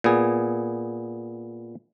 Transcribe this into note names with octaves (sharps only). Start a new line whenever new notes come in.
A#2 B3 G#4